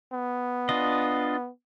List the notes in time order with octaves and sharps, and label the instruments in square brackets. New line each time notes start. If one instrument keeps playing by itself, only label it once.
[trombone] B3
[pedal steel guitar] D4 F4 D#5